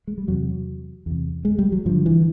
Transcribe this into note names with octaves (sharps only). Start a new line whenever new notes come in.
G#3
G3
E2 C3 F#3
E2 C3
G#3
G3
F#3
G2 D3 F3
E3